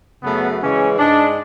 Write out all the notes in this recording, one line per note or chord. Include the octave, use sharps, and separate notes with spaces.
F#2 C#3 F#3 A3 B3
C#3 E3 G#3 C#4
G#2 G#3 D4